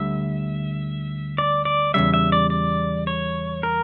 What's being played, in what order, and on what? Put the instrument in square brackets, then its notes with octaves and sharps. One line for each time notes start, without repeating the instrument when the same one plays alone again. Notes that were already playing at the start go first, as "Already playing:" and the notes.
Already playing: [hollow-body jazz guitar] D2 D3 G3 [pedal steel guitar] E5
[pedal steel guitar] D5
D5
[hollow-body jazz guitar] E2 C#3 G3 [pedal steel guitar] E5
[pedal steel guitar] E5
D5
D5
C#5
A#4